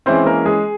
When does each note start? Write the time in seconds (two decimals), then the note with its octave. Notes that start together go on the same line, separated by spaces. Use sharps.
0.06 E3 G#3 C4 C#4 E4 C5
0.26 A#3 A#4
0.46 G#3 G#4